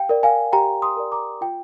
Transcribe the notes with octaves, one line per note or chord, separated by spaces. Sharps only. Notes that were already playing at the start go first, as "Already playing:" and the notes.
Already playing: G4 F5 G5
A#4 D5
F5 G#5
G4 G5 A#5
C6 D#6
A#4 D5
A#5 D6
F4 G5